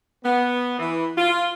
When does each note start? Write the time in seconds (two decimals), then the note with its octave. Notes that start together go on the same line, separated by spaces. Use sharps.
0.24 B3
0.79 E3
1.18 F4